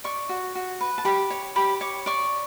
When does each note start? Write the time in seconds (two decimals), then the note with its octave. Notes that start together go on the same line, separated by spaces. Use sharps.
0.04 D5 C#6
0.29 F#4
0.55 F#4
0.81 B4
0.98 A5
1.05 G4 B5
1.30 C#5
1.56 G4 B5
1.81 C#5 D6
2.06 D5 C#6